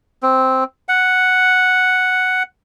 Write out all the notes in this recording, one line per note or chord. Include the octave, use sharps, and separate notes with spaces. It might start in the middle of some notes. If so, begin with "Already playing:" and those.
C4
F#5